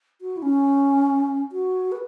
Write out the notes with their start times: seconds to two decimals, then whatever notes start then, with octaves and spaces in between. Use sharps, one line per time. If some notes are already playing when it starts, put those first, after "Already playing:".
0.21 F#4
0.37 E4
0.42 C#4
1.52 F#4
1.92 B4